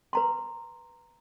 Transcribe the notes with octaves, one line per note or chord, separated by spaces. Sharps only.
B4 A#5 C6